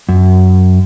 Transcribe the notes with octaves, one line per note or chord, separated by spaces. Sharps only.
F#2